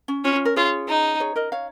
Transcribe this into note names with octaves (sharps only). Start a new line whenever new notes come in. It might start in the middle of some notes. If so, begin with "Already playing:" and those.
C#4
C#4 F4
F4
A#4
F4 G#4 C#5
D#4
G#4 C#5
A#4 D#5
C#5 F5